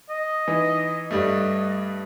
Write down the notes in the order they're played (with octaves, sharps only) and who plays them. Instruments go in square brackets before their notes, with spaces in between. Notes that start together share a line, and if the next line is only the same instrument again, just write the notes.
[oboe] D#5
[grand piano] E3 D#4
[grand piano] G2 G3 A3 [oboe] D#5